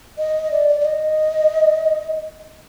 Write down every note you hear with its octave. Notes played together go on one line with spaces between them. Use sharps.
D#5
D5
D5
D5
D#5